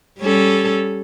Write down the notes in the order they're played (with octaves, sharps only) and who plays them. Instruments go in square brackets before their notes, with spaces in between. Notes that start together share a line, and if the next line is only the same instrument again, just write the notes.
[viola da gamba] G3 C#4 A4